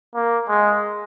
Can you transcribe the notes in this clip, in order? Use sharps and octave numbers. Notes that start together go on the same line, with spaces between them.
A#3
G#3